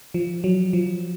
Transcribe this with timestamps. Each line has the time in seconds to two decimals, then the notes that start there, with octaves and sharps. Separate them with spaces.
0.14 F3
0.44 F#3
0.73 F3